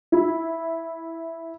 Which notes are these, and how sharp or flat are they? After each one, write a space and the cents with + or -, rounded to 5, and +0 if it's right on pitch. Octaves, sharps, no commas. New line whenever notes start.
E4 -5